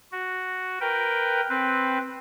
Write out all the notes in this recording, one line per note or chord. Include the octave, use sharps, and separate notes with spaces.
F#4
A#4 B4 G5
C4 B4